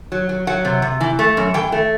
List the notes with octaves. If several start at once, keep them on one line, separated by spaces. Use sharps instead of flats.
F#3
F#3
F#3 F#5
C3
C3
E3
A3
F#2
E3 G5
A3